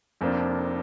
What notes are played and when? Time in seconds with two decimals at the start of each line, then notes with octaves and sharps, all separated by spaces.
0.21 F1 F2 F3 A#3 D4